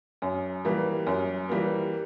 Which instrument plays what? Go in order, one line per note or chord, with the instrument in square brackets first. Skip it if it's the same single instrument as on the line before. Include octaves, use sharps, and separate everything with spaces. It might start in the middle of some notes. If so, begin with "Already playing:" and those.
[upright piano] F#2
E3 G3 A#3
F#2
E3 G3 A#3